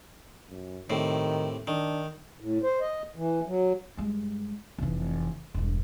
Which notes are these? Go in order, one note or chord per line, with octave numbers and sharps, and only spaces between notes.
F#2
A2 C3 D#3
D#3 D4
A2
C5
D#5
E3
F#3
G2 G#3
F1 E3
E1 G2